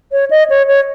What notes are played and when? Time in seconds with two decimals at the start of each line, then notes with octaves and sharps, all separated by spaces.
0.12 C#5
0.31 D#5
0.50 C#5
0.68 C#5